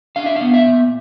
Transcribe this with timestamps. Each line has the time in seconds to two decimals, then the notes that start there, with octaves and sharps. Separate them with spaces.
0.16 D4 F5
0.26 E5
0.36 B3 F5
0.54 E5
0.67 A#2